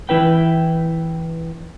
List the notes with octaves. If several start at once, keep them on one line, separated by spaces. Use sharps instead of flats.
E3 E4 B4 G5